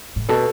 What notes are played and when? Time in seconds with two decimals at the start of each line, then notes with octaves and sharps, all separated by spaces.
0.16 A2
0.29 B2 A4